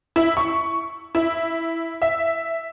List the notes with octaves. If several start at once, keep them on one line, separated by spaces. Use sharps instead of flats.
E4
C#6
E4
E5